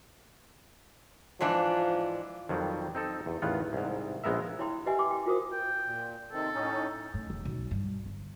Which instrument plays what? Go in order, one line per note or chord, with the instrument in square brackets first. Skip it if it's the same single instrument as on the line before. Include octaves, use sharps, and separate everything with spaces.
[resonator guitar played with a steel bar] G#2 E3 D4 [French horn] F3
[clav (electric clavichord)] F2 D#3 F#3 G3
C4 D#4 A4
E2
A1 E2 D#3 B3 F4 F#5
C2 G#2
A#1 G#3 B3 A#4 E5
[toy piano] E4 C#5 G5 B5 C6
G4 B4 D#5 E5 F#5 G#5
G5 C6 D6
G5
F4 F#4 A#4 C5 D#6
[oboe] G5
[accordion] A#2
[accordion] C3 D#3 C4 [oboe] A4
[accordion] A2 C#4 D#4
[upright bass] A2
E1
B1
G2
G1